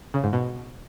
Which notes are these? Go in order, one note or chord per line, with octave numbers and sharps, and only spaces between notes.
C#3
G#2
B2